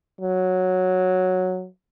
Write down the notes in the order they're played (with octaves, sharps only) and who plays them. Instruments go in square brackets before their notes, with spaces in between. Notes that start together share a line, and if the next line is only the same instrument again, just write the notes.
[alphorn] F#3